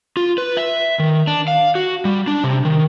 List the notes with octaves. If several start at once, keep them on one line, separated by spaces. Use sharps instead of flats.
F4
B4
E5
D#3
D4
F5
F#4
G3
D4
C3
D#3